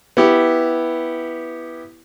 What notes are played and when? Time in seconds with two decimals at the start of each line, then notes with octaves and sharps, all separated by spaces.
0.17 B3 E4 G4